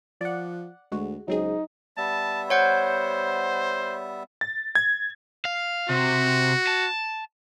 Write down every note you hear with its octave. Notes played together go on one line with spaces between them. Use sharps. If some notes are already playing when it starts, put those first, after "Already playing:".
F3 D5 F#5
D2 G#3 F#4
C#2 F#3 C4 D#4 G#4
G3 B3 E5 A5
C5 C#5 F#5 G6
A6
G#6
F5
C3 F#4
A5